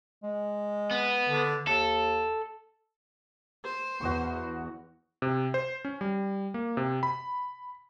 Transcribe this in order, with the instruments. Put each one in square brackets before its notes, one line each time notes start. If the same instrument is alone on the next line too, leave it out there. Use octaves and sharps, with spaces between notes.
[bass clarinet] G#3
[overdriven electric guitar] B3
[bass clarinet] D3
[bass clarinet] D#2 [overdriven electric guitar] A4
[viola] C5
[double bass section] E2 [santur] F#4 D#5 C#6
[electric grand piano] C3
C5
C#4
G3
A#3
C3
B5